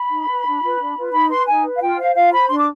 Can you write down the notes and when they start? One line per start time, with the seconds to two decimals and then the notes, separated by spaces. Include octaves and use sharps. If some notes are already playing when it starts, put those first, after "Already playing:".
Already playing: B5
0.11 D#4
0.28 B4
0.45 D4
0.62 F4 B4
0.79 D4
0.97 F4 B4
1.13 D#4 B5
1.30 B4 C6
1.47 D#4 G#5
1.64 B4
1.76 F5
1.81 F4 G5
1.98 C5 F5
2.15 F4 F5
2.32 C5 B5
2.49 D4 C6
2.58 D6